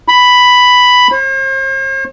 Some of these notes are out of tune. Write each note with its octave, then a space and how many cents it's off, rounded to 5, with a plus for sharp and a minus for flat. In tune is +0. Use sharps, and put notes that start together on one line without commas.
B5 +5
C5 +45